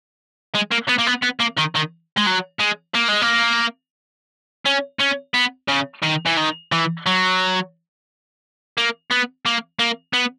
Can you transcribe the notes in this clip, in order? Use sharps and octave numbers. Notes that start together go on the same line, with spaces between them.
G#3
A#3
B3
A#3
B3
B3
A#3
D#3
D#3
G#3
F#3
G#3
A#3
G#3
A#3
C#4
C#4
B3
C#3
D#3
E3
D#3
E3
F#3
A#3
B3
A#3
A#3
B3